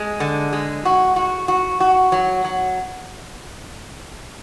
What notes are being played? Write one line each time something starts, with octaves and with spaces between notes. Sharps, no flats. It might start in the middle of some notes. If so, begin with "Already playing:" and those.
Already playing: G#3
D3
G#3
F#4
F#4
F#4
F#4
F#3
F#3